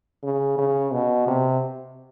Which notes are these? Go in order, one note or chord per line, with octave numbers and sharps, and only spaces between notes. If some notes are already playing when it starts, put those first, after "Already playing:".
C#3
C#3
B2
C3